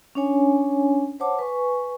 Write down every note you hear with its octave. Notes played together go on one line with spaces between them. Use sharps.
C#4 D4 C#5 G#5
C5 C#5 F#5 A5 D6
B4 G#5 C#6